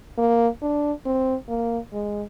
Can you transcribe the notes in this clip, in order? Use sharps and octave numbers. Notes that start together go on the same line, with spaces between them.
A#3
D4
C4
A#3
G#3